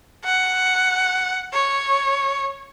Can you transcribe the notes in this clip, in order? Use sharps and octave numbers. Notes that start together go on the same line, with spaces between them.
F#5
C#5